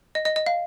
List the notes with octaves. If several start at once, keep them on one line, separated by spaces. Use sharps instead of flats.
D#5
D#5
D#5
F5